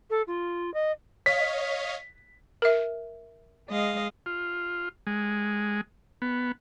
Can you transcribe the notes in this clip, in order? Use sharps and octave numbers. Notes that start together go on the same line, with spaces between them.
A4
F4
D#5
C#5 D#5 F5 B6
A#4 E5
G#3 D#5 F5
F4
G#3
B3